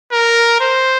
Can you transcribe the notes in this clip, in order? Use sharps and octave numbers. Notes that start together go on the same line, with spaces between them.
A#4
C5